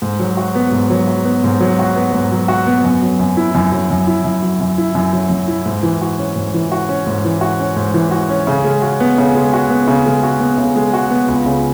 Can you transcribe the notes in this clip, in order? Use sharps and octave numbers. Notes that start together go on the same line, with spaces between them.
G#2
F#3
F#4
B3
G#2
F#3
F#4
B3
G#2
F#3
F#4
B3
G#2
F#3
F#4
B3
F#2
F#3
F#2
E4
F#2
F#3
F#2
E4
F#2
F#3
F#2
E4
F#2
F#3
F#2
E4
G#2
E3
F#4
C#4
G#2
E3
F#4
C#4
G#2
E3
F#4
C#4
G#2
E3
F#4
C#4
C#3
G#3
F#4
B3
C#3
G#3
F#4
B3
C#3
G#3
F#4
B3
C#3
G#3
F#4
B3
C#2
C#3